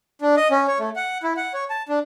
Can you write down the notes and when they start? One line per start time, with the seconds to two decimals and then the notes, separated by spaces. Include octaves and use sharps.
0.21 D4
0.37 D#5
0.51 C#4
0.68 C#5
0.79 A3
0.96 F#5
1.23 E4
1.37 F#5
1.54 C#5
1.70 A5
1.89 D4